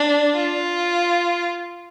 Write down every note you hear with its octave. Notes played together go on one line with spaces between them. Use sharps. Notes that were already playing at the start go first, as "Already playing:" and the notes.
Already playing: D4
F4